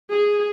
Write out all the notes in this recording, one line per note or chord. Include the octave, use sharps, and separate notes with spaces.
G#4